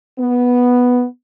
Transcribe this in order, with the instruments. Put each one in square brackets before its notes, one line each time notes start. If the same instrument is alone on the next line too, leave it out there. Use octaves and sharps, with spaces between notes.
[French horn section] B3